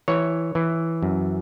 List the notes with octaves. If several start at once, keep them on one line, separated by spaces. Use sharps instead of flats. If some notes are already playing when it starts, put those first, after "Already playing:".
E3 C#5
E3
F#2